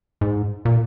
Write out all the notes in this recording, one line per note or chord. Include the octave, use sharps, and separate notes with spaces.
G#2
A#2